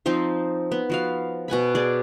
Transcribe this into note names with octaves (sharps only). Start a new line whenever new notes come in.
F3 C4 D#4 C5
B3
F3 F#4 F5
B2 F#5 G#5 B5
G#4 D5 D#5